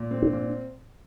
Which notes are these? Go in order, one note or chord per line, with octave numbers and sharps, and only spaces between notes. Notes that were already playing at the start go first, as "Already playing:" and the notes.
Already playing: A#2
C4
D4
A#2